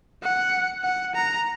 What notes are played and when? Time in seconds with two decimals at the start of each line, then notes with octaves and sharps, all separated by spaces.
0.22 F#5
0.83 F#5
1.15 A#5